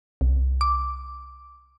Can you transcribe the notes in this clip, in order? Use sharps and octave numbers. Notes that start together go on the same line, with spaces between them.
C2
D6